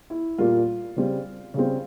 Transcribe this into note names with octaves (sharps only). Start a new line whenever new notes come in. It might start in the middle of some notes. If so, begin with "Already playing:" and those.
E4
A#2 G3 A#3 F4
C#3 G3 C4
C#3 G3 C4